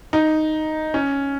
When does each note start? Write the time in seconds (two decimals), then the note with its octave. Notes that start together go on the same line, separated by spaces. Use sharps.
0.13 D#4
0.94 C#4